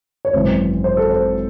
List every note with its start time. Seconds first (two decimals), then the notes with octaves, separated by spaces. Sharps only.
0.25 C#5
0.33 G#1 F#2 E3 C5
0.84 C5
0.97 A4
1.09 C5